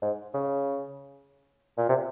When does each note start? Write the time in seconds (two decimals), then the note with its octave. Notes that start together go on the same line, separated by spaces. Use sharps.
0.02 G#2
0.34 C#3
1.78 A#2
1.89 C3